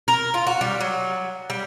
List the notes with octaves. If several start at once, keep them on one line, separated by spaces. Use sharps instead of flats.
A#4
F4
F#4
G3
F#3
G3